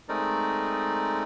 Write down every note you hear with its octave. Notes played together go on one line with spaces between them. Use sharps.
G#3 A3 C4 D#4 A#4 D5